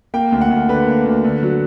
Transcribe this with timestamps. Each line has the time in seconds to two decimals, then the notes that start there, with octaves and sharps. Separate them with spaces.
0.14 A#3 G5
0.32 D2
0.41 F#5
0.50 D2
0.69 D3 B4
0.87 A#3
1.06 D2
1.24 D3
1.43 F#3